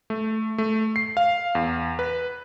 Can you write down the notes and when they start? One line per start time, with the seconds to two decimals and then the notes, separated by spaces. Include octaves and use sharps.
0.10 A3
0.58 A3
0.96 C7
1.17 F5
1.55 E2
1.99 B4